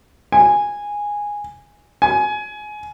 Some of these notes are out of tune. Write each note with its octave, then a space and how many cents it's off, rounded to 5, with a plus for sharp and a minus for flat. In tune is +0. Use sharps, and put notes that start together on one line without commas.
G#5 -10
G#5 +20